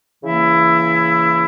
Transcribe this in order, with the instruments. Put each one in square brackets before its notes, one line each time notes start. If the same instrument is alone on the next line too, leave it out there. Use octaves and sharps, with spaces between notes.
[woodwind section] C#3 E3 A#3 E4